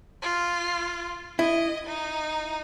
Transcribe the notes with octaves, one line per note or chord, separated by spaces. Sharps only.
F4
E4 D#5
D#4